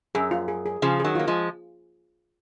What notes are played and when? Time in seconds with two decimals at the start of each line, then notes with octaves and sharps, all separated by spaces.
0.15 F#2 G#4
0.31 F4
0.48 G#4
0.66 G#4
0.82 C#3 F3 G#4
1.00 D#3 F#3 G#4
1.15 A#3 F4
1.27 F3 G#3